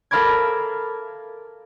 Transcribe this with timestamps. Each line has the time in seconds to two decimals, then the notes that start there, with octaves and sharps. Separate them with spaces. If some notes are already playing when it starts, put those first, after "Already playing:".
0.11 A4 A#4 F5 B5 D6 G#6